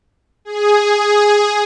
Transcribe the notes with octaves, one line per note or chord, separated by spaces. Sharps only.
G#4